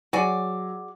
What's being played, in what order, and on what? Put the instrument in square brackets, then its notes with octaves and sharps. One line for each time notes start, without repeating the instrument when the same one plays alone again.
[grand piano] F#3 [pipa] F#4 G#4 D5